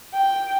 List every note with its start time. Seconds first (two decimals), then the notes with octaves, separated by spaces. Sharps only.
0.14 G5